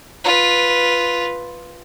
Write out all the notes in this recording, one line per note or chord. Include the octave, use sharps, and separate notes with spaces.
F4 B4